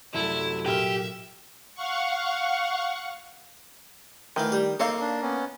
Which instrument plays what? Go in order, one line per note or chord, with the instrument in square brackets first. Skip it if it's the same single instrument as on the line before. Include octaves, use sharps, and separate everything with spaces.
[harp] C2 F#2 A3 [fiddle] E4
[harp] A#2 F6 [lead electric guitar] G4 [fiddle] E5
[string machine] F5 F#5 C#6
[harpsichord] D2 E3 F5 [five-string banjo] D#3
[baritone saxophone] G3 [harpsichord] G4
[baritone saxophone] A#3 [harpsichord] C4 D#4 C#5 [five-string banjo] A4 F5
[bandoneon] D4
B3 C#4